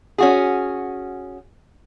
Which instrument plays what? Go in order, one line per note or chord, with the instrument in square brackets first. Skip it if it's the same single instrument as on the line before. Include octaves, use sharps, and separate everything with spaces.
[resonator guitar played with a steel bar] C#4 F#4 G#4